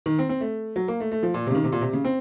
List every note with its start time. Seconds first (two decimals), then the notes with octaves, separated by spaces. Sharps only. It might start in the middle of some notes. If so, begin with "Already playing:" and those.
0.06 D#3
0.19 C4
0.29 C4
0.41 A3
0.76 F#3
0.88 A#3
1.00 A3
1.12 A3
1.23 F3
1.34 A#2
1.47 C3
1.51 C#3
1.55 D#3
1.64 C3
1.72 A#2
1.81 C3
1.93 C#3
2.04 C4